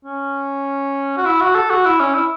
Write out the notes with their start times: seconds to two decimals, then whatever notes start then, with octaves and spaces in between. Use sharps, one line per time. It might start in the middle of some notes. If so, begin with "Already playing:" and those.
0.05 C#4
1.17 F#4
1.25 E4
1.40 F#4
1.55 A4
1.70 F#4
1.85 E4
2.00 C#4
2.14 E4